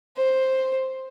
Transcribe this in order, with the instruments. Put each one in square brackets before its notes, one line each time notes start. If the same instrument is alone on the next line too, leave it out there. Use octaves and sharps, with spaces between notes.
[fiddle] C5